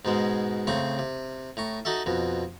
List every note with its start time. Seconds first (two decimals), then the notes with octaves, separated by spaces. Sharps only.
0.05 G#2 B2 G#3
0.67 A2 C#3 C4 A#5 C#6
0.99 C3
1.57 A2 A#5 C#6
1.85 D#4 F#4 A4 E5
2.06 F2 B2